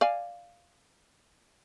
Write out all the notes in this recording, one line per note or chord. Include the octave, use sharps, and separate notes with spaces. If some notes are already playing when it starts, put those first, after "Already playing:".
D5 F5 G#5